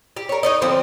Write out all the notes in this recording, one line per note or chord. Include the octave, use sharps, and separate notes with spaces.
G4
A#4 C#5
D#4 C#5 D#5
D3 F3 C4